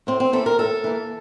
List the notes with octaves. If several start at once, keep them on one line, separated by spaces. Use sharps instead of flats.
A2 C4
C4
E3 A#3 A4
A#4
A2 A4
E3 A#3